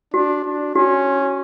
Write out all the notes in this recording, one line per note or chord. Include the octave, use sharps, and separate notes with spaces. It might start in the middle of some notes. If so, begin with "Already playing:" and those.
D4 F#4
D4
C#4 F#4